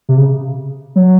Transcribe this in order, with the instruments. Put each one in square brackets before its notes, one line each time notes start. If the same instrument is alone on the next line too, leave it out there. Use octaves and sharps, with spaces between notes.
[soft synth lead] C3
C#3
F#3